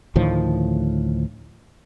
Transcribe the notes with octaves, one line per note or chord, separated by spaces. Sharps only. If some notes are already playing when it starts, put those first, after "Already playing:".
D2 A2 D#3 F3